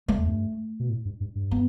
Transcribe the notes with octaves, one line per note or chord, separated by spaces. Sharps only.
A3
E2
G2
B2
A2
G2
G2
G2
B3